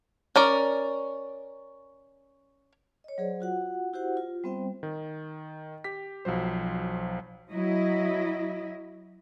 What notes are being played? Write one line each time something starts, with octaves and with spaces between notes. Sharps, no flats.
C#4 A#4 D5
C#5 D#5
F#3 G#4 C5 D5
F4 F#4 F#5
E4 F#4 G4 C5 F#5
F4
G3 B3 C4 C5 E5 G5
D#3
G4 B6
B1 F3 F#3 C5
F#3 E4 D#5